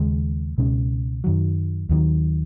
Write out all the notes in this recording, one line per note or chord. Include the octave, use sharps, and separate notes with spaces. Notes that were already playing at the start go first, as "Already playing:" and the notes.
Already playing: D#2 C#3 G#3
C#2 B2 G#3 C#4
F#2 D#3 F#3
D#2 D#3 F#3